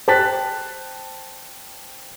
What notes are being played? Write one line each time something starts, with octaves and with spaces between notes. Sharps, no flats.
C5 G5 A5 F#6 A6 B6